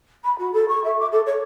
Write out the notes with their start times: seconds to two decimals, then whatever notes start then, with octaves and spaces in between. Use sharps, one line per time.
0.24 B5
0.39 F#4
0.53 A4
0.69 C#6
0.84 E5
0.99 D6
1.12 A4
1.26 C#5